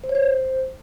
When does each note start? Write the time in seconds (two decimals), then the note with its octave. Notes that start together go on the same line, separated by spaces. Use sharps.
0.04 C5
0.09 C#5
0.15 C5